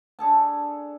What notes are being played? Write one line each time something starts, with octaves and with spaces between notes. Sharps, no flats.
D4 G#4 A4 A5